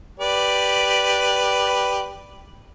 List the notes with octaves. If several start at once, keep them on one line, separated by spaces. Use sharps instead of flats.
G4 B4 D5